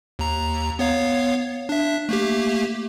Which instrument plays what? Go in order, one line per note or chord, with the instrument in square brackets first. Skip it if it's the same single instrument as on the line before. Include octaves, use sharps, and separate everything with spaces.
[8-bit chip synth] D#2 A#5
B3 C#5 F5
D4 E5
A3 A#3 G4